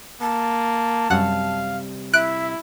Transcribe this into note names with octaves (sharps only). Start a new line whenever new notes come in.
A#3 A5
F#2 C3 G3 F5 F#5
E4 E5 F#6 D7